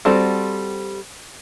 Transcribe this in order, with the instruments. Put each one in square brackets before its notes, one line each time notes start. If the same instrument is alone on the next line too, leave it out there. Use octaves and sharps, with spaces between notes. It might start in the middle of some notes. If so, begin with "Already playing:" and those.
[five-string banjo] G3 C4 F#4 A4 C5